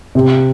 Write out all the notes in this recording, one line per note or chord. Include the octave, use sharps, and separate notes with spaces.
C3